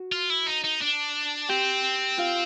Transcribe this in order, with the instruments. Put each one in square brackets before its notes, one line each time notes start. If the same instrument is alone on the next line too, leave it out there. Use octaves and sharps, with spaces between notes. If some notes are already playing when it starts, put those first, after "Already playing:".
Already playing: [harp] F#4
[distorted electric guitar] F4
E4
D#4
D#4
D4
[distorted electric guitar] C4 [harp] G4 G5
[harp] F4 F5